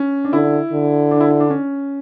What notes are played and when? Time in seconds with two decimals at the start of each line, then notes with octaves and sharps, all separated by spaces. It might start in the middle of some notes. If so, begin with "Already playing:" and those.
Already playing: C#4
0.25 D4
0.33 D3 E4
0.72 D3
1.11 D4
1.20 E4
1.31 E4
1.40 D4
1.50 C#4